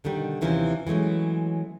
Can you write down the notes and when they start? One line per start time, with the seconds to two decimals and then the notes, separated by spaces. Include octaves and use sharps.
0.04 B2 D3 D#3 G3
0.41 D#2 C3 E3 F3 C#4
0.87 E3 F#3 G#3 A3 C#4